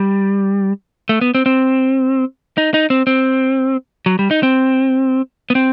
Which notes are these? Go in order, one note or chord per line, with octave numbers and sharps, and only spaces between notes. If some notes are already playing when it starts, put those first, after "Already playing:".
Already playing: G3
A3
B3
C4
C4
D#4
D#4
C4
C4
F#3
G3
D#4
C4
B3
C4